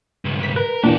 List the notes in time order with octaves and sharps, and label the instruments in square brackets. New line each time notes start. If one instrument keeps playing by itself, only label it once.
[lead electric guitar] C#2 G2
[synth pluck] B6
[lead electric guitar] A#4 [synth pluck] B4
[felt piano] A#2 E3 [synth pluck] D4 [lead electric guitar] F#4 G4